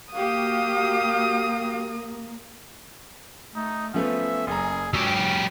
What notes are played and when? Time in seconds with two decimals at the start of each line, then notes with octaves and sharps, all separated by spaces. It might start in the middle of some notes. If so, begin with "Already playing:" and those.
0.13 A#3 F#4 G4 F5 D#6
3.55 A3 D#4
3.94 F3 A3 B3 C#4 E5
4.47 F#1 G#4 A#5
4.93 G2 F#3 C#4 G4 E6